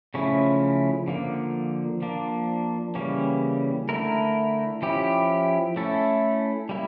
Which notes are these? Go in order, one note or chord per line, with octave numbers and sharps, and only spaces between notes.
C#3 F3 A3 C#4 E4
D3 F3 A#3
F3 A#3 D4
C#3 E3 G3 A#3 C#4
D3 A3 E4 A#4
F3 C#4 E4 G4
A3 C#4 E4 A4
G3 A#3 E4